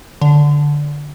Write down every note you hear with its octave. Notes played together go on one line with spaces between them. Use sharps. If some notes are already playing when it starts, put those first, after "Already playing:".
D3